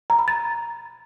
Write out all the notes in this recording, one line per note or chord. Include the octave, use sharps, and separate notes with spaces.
A#5
B5
A6